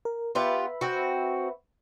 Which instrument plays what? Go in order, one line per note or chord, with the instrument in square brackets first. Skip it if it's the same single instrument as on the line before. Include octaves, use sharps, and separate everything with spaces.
[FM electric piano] A#4
[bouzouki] B3 F4 G4 [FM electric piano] B4 E5 B5
[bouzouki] C4 F#4